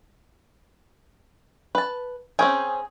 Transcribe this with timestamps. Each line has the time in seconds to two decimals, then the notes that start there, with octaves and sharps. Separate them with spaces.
1.75 B4 A5
2.39 C4 C#4 G#4 G5